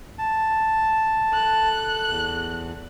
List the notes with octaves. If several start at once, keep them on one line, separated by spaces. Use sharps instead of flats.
A5
A4 F#6
E2